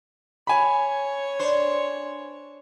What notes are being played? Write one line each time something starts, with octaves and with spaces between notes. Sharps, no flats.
C#5 G#5 B5
D4 C5